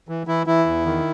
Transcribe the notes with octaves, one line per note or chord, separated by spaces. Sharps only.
E3
E3 E4
E3 E4
E2
D#3